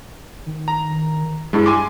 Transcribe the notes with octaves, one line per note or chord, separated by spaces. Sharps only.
D#3
A#5
G2 G#3 E4
G#5 C6 D6